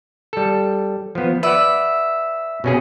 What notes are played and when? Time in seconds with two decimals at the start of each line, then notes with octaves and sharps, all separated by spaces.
0.33 G3 A4
1.15 F3 B3
1.43 B4 D5 E5 F#5
2.64 B2 C#4 G#4